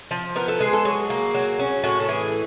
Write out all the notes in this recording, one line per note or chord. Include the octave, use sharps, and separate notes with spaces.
F3
B3 A#4
A4
G#3 G#4
A4
F#3 G#4
A#3
F#3
C#4
A2 F#4
A4
E3 G#4